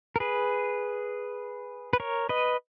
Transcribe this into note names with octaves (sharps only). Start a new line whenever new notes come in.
A#4
G#4 B4
B4
A#4 C#5
B4 D#5